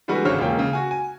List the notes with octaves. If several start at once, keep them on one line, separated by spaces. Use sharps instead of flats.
D3 E3 G3 G#3 F#4 B4
G#1 G2 C#3 C5 C#5 F6
E1 G#3 A#3 C#4 F4 G5
C#3
F#4 G#5
G#5